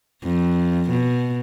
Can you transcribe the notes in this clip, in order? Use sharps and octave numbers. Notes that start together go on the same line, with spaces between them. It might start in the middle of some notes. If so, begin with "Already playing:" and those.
F2
B2